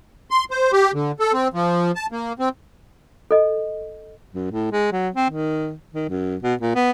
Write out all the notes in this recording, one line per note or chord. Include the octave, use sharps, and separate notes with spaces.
C6
C5
G4
D3
A4
C4
F3
A5
A#3
C4
A4 D#5
F#2
A2
G#3
F#3
C4
D#3
D#3
F#2
B2
A#2
B3